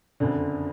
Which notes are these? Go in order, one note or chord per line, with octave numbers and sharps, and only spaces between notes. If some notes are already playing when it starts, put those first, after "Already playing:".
F#1 F2 D3